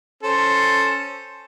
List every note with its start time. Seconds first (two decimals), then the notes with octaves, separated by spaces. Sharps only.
0.23 C#4 A4 C5